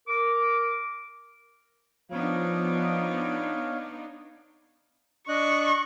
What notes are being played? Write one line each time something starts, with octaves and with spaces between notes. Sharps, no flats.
A#4 D6
F3 B3 D4 D#4 C#5 F5
D4 D#5 C#6 F#6